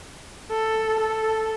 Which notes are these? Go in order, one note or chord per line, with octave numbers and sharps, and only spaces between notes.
A4
A4